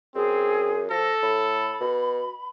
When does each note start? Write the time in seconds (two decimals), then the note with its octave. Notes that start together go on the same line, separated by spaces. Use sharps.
0.15 F#2 C4 G#4
0.91 F3 A4 A#6
1.22 A2 B5
1.81 B2